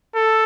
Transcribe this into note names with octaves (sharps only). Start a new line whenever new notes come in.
A4